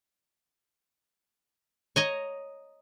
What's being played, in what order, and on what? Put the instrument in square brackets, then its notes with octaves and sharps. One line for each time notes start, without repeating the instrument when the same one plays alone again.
[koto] C#5 D#5 A#5